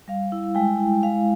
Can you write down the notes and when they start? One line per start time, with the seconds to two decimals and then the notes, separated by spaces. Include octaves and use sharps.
0.08 G3 F5
0.32 E4
0.55 G#3 G5
0.80 E4
1.03 G#3 F5